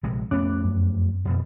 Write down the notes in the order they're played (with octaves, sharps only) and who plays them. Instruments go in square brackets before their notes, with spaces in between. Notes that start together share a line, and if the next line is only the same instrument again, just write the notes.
[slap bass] A#1 C3 G#3
[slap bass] F2 A3 B3 [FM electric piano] C#4 D6 F#6
[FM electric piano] F#2
[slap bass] F2 B2